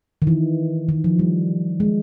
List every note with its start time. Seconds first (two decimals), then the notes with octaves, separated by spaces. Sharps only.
0.22 D#3
0.27 E3
0.89 D#3
1.04 F3
1.19 G3
1.80 G#3